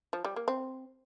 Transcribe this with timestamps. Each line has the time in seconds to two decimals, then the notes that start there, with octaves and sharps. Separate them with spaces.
0.13 F3
0.25 G3
0.36 A#3
0.48 C4